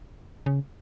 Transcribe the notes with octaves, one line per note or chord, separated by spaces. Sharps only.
C#3